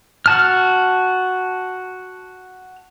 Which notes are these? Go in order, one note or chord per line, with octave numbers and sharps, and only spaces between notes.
F#4 A5 F6